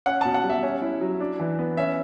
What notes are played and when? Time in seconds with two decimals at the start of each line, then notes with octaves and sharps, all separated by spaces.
0.06 C#4 F#5
0.21 B2 A5
0.34 F#5
0.44 G3
0.50 E5
0.63 C#4
0.82 E4
1.01 F#3
1.20 D4
1.40 E3
1.59 B3
1.77 C#4 E5